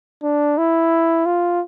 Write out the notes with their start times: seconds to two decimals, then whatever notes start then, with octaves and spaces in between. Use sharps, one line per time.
0.23 D4
0.58 E4
1.26 F4